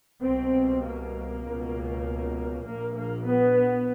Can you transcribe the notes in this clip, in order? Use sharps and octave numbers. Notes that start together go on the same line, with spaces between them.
C2 B2 C4
A#3
C#2 B2
A#1 A#2 A#3
A#3
B3